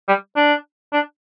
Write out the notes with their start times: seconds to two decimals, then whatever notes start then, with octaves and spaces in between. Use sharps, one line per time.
0.08 G3
0.36 D4
0.93 D4